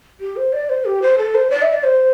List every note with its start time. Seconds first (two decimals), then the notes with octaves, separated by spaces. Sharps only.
0.20 G4
0.36 C5
0.53 D5
0.69 C5
0.85 G4
1.02 C5
1.18 A4
1.35 C5
1.51 D5
1.62 E5
1.73 D5
1.84 C5